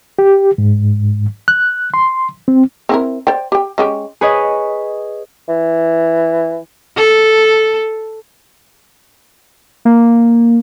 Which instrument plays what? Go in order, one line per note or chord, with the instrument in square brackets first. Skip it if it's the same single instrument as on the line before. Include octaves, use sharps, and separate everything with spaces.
[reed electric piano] G4
G#2
F#6
C6
C4
[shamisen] C4 E4 A#4
C5 D5 G5
G4 G5
G#3 C#4 G4
[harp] G#4 B4 C#5 D#5
[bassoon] E3
[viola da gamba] A4
[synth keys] A#3